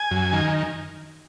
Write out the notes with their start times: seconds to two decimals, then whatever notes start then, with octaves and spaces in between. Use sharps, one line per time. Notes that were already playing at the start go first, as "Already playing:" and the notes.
Already playing: G#5
0.11 F#2
0.33 D#3